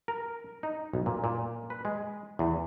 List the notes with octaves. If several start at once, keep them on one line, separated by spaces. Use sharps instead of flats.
A#4
D#4
B1
A#2
A#2
B4
G#3
E2